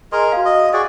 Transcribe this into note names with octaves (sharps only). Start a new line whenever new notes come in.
G#4 A#4 D#5 C6
F#4 F5
D#5
F#4 G#4 D5 D#6